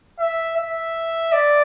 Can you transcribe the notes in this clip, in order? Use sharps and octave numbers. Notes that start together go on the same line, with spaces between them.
E5
E5
D5